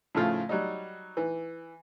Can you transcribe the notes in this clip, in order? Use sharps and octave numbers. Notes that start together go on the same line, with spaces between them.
A2 C#3 F3 A3 F4 F5
F#3 G3 D#4
E3